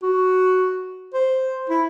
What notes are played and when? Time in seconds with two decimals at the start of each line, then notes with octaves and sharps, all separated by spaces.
0.03 F#4
1.14 C5
1.70 E4